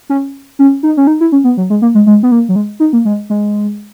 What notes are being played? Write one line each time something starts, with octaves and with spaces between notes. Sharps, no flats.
C#4
C#4
D#4
C#4
D#4
E4
C#4
B3
F#3
G#3
A#3
G#3
G#3
B3
A#3
F#3
G#3
D#4
A#3
G#3
G#3